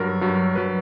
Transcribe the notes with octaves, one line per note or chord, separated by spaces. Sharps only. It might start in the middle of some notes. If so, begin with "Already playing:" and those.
Already playing: G2 F#3 A#4
G2 F#3
F#3 B4